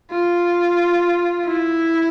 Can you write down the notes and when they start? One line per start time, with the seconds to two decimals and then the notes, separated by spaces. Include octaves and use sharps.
0.11 F4
1.46 E4